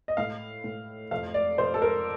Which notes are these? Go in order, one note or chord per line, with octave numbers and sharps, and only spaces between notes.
D#5
A2 F5
A2
F2 F5
D5
F2 C5
A4
A#4